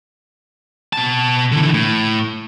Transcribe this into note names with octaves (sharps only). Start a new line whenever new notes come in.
B2 A5
D3 E3
A2